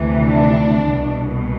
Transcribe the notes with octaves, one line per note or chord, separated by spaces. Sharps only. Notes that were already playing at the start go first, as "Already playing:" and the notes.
Already playing: D2 C3 E3
D4
C2 B2